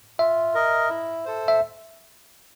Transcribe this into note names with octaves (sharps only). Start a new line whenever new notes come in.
F4 E5
A#4 D#5
E4
A4 C5
E5